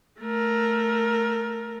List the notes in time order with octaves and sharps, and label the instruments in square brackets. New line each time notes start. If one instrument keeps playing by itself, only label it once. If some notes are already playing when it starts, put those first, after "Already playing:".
[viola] A3 A#4